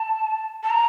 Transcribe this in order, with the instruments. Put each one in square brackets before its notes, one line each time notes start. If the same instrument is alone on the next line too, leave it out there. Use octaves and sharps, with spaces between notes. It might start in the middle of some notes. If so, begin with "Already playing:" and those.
Already playing: [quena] A5
A5
A#5